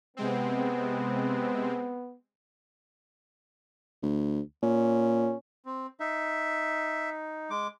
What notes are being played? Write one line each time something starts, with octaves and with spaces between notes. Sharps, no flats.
C3 G#3 B3 C4
D2
A#2 C#4
C4
D#4 E5
G#3 D6